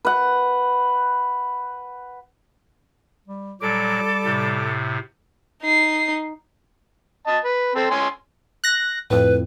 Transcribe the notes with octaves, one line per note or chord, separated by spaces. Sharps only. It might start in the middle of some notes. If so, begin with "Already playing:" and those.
B4 F#5
G3
A#2 F#3 G3 A4 D6
A2 C3
D#4 C7
D#5 A5
B4
C4 A4
C#4 G#5 C6
F#6 A#6
F2 A2 B4